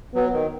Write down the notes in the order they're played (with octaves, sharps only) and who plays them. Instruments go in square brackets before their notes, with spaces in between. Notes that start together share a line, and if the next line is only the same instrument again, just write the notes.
[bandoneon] F#3 [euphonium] B3
[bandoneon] D#3